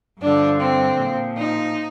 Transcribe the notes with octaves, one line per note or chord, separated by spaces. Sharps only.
G2 D3 F3 D4
C4
A#2 F3
D#4